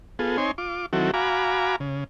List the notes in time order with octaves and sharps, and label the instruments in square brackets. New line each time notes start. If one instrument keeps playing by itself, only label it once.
[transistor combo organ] B3 F4 G#4 A4
C4 D#4 C#5 G#5 C6
F4 D6
D#3 F#3 C4 E4 F#4 A4
F#4 F5 G#5 A#5 B5 D6
C#3